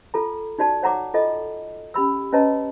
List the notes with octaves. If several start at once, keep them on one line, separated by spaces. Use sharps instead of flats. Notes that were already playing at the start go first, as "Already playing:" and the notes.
F4 A4 A#5
D#4 F#4 D5 A5
C#5 F#5 A#5 C#6 D6
F4 A4 D#5
C#4 G4 B5 E6
C#4 B4 C#5 D#5 A5 A#5